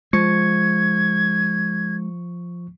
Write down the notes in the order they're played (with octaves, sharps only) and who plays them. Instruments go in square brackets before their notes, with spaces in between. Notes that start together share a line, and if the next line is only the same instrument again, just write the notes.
[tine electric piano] F3 C#6 C#7 [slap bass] G#3 [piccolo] G#6